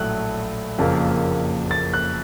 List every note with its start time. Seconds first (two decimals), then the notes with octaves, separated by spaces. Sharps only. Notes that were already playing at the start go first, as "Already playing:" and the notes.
Already playing: A#1 A2 F#3 A3 F#6
0.79 F#1 F2 C#3 F3 A#3
1.71 A6
1.94 F#6